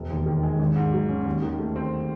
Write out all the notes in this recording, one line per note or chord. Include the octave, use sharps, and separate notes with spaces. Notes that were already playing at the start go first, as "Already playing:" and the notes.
Already playing: E1
D#2
D#3
G#3
G#1
G#2
F#3
C#4
D#2
D#3
A3
C4